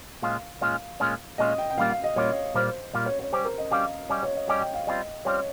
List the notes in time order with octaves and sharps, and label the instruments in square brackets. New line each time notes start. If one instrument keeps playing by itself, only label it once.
[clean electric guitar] A#2 G#3 C#4 F4 [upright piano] F5
[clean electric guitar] A#2 G#3 C#4 F4
A#2 G#3 C#4 F4
[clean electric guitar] A#2 G#3 C#4 F4 [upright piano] D#5
[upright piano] G5
G5
[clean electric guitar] A#2 G3 A#3 F4 [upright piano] F5
[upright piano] F5
D#5
[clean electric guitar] A#2 G3 A#3 F4 [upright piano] C#5
[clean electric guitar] A#2 G3 A#3 F4 [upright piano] C5
[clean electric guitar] A#2 G3 A#3 F4
[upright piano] C#5
C#5
[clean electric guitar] G3 C#4 G4 [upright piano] C5
[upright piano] A#4
D#5
[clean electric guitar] G3 C#4 G4 [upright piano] F5
[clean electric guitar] G3 C#4 G4 [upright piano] D#5
[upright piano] C#5
D#5
[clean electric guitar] G3 C#4 G4 [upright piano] D#5
[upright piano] G5
F5
[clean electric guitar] G3 C4 F4 [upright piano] D#5
[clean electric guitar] G3 C4 F4 [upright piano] C#5